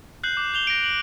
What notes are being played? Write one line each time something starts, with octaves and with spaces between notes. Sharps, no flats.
F#6 G6 C7 F#7
D6
G6 F7 G7
A#6 D7
F#7